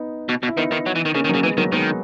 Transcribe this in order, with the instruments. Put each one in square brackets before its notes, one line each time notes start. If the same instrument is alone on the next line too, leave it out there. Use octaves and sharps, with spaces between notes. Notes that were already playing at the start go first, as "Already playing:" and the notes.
Already playing: [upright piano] B3 D#4
[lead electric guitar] B2
B2
[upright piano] E4
[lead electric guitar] D#3 [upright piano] B3 D#4
[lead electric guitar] D#3
F#3
E3
D#3
[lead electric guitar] C#3 [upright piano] A#3 C#4
[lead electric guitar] D#3
[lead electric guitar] C#3 [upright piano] F#3 A#3
[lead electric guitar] E3 [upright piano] G#3 B3
[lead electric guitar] D#3 [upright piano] F#3 A#3
[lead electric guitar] D#3 [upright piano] G#3 B3